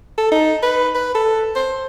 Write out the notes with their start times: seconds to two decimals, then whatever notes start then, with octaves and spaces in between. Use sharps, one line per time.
0.18 A4
0.32 D#4
0.63 B4
0.95 B4
1.14 A4
1.56 C5